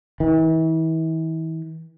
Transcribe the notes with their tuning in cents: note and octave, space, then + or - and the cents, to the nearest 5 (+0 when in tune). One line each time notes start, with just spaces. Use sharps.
E3 -40